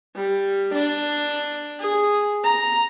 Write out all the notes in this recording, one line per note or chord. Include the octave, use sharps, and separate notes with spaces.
G3
D4
G#4
A#5